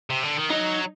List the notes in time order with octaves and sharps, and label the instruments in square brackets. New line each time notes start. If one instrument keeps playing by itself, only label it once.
[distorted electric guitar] C3
D3
D#3
[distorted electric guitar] F#3 [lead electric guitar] D#4